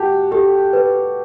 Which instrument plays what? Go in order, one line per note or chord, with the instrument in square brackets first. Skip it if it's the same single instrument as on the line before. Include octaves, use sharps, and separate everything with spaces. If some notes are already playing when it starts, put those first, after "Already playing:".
Already playing: [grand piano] F#4 G4 [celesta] A5
[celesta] G4 [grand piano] A4
[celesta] B4